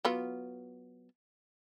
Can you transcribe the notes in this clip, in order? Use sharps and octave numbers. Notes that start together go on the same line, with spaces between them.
F#3 B3 F4